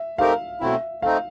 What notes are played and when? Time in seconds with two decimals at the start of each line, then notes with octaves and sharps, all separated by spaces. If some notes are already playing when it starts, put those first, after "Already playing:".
Already playing: E5
0.18 A3 C4 D#4 G4 A#4 F5
0.60 B2 F#3 A3 C4 E4 E5
1.02 A3 C4 D#4 F5